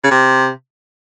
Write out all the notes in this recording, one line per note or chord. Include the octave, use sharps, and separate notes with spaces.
C#3
C3